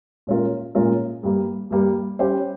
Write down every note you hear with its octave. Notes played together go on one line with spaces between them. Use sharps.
A#2 G#3 C#4 F4 A#4
A#2 G#3 C#4 F4 A#4
G2 G3 A#3
G2 G3 A#3
G3 C#4 G4 C5